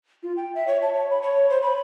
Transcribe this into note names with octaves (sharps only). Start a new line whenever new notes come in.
F4
G5
E5
C#5
A5
C#5
B5
C#5
C5
B5